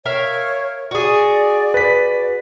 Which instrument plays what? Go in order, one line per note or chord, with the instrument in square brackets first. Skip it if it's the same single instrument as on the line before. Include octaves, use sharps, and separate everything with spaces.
[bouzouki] A#4 E5 F5 [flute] C#5
[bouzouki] F#4 G#4 [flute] D5
[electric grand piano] B4 B6